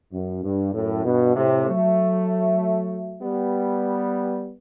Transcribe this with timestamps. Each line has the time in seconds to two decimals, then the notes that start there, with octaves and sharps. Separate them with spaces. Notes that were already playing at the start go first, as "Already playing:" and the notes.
0.12 F#2
0.43 G2
0.73 F#2 A2
1.05 G2 B2
1.36 A2 C3
1.67 F#3 A3
3.22 G3 B3